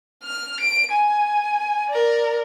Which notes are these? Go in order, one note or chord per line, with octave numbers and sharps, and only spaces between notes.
F6
D7
G#5
A#4 D5